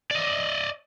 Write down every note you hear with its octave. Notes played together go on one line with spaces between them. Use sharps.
D5 D#5